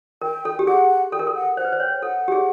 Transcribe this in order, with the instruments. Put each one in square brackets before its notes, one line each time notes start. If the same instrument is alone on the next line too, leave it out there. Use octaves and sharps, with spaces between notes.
[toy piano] A#4 [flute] G5
[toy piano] A4
G4
[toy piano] G#4 [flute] F#5
[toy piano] A4 [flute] G5
[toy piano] A#4
A4
[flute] F#5
[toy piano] C5 [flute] F#5
[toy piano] B4
C5
[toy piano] C#5 [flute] G5
[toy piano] A4 [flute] F#5
[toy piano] G4
G#4